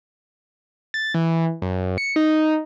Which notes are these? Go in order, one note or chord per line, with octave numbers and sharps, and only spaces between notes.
A6
E3
F#2
C#7
D#4